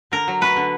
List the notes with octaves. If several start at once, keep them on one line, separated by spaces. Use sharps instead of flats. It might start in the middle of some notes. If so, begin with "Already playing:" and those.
D3 A#4
F#3
A3 B4
D3